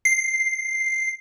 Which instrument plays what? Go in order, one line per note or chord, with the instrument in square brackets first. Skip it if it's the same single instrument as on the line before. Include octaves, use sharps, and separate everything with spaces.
[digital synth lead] C7